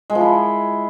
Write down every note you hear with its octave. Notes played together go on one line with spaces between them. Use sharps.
G#3
F3
E4